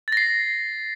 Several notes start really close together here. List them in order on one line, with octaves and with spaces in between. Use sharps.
A6 A#6 C7